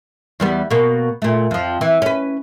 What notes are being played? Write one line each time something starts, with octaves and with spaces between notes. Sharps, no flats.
E2 G3 B3
B2 A#3
A#2 A3
F2 F3
E3
C#4 B4